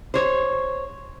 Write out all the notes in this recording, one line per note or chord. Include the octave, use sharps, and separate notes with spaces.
C5 C#5